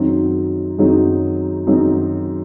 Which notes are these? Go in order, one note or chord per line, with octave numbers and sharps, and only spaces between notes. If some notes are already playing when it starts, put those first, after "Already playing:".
Already playing: F#2 D#3 F#3 C4 D#4
F#2 D#3 F#3 C4 D#4
F#2 D#3 F#3 C4 D#4